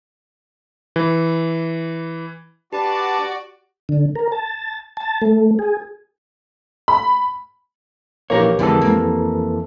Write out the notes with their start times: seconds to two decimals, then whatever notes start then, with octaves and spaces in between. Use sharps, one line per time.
0.96 E3
2.73 D4 F#4 G4 B4 D5 A5
3.89 D3
4.15 A#4
4.32 A5
4.97 A5
5.22 A3
5.59 G#4
6.88 B5
8.30 A#1 E3 A#3 G4 A#4 C#5
8.59 F2 D3 E3 G#3 B3 A4
8.81 A#3